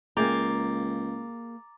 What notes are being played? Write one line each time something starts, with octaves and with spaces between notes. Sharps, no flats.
C#2 A#3 G#4 G5 A#5 D6 A6